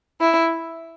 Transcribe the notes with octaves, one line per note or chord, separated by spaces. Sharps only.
E4